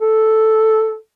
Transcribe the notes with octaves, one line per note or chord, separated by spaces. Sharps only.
A4